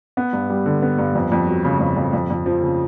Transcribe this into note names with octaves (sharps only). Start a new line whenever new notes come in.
B3
G2
G3
D3
B3
G2
F2
F2
F#3
C#3
F2
F2
F2
F2
F3
C#3